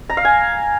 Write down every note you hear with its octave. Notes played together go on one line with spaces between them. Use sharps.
A#5
F5
G#5